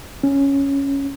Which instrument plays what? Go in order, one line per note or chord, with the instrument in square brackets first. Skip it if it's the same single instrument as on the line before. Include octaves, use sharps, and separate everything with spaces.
[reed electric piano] C#4